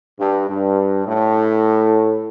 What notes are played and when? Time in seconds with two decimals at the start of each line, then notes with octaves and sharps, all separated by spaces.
0.19 G2
0.49 G2
1.06 A2